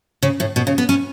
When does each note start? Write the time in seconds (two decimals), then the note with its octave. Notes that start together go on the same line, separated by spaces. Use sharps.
0.23 C#3
0.40 A2
0.56 B2
0.67 C#3
0.78 B3
0.89 C#4